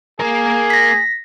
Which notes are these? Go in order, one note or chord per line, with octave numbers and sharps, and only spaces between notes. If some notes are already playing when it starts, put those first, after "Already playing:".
A#3 G#4 A#4
A#6 B6